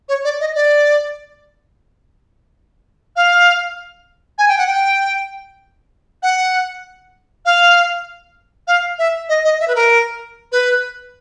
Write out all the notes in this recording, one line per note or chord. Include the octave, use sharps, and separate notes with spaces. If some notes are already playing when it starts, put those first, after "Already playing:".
C#5
D5
D#5
D5
F5
G#5
G5
F#5
G5
F#5
F5
F5
E5
D#5
D#5
E5
B4
A#4
B4